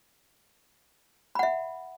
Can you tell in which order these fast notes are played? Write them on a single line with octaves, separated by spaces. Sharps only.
B5 F#5 E5